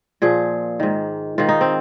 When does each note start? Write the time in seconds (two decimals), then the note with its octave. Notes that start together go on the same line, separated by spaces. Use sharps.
0.22 A#2 F3 G#4
0.80 G#2 D#3
1.38 G#2 D#3 F4
1.49 D#4
1.61 C4